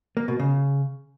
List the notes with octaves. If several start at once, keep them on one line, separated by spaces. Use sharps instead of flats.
A#3
B2
C#3